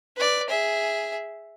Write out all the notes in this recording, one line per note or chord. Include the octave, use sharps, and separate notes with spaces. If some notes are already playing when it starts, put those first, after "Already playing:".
B4 D5
G#4 E5